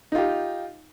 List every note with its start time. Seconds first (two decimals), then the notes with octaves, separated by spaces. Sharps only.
0.12 D#4
0.15 F4
0.18 G4